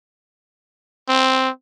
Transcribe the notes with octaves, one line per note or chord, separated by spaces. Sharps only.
C4